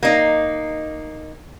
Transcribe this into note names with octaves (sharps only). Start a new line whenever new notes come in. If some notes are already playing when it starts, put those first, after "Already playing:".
A#3 D#4